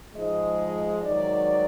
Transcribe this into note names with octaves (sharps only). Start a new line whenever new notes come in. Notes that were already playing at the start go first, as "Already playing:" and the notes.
G#2 F3 G#3 D#5
G#2 D#3 F#3 D5